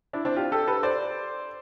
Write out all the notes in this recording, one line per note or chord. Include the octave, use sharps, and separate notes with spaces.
D4 E4
C4 D4
F4 G4
G4 A4
A4 B4
C5 D5